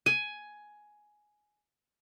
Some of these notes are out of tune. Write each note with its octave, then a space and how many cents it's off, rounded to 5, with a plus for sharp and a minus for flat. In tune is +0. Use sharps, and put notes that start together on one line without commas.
G#5 +10